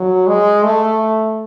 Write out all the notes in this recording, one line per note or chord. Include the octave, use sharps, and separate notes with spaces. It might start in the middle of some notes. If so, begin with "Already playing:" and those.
Already playing: F#3
G#3
A3